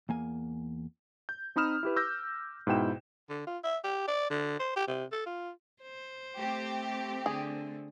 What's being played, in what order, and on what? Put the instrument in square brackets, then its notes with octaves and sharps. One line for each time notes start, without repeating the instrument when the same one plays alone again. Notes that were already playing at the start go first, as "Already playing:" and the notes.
[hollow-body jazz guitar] E2 A#3 G#5
[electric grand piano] G6
C4 D#4 B5 D#6 F6 E7
E4 G4 B4
D6 E6 F6 G6 A#6
G#2 B2 E4 G5 E7
[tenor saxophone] D3
F4
E5
G4
D5
D3
C5
G4
C3
A4
F4
[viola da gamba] C5
[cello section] A3 C4 [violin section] G4
[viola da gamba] D3 [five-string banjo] G#4